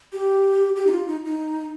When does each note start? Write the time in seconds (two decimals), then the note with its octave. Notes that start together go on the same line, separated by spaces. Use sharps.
0.13 G4
0.76 G4
0.87 D#4
0.91 F4
1.08 D#4
1.25 D#4